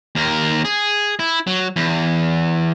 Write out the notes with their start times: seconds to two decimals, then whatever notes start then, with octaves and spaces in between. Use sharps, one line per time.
0.15 D#2 A#4
0.65 G#4
1.19 E4
1.47 F#3
1.76 E2